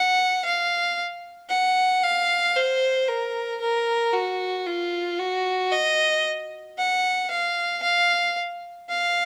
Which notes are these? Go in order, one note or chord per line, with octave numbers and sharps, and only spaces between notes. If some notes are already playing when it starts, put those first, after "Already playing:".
Already playing: F#5
F5
F#5
F5
C5
A#4
A#4
F#4
F4
F#4
D#5
F#5
F5
F5
F5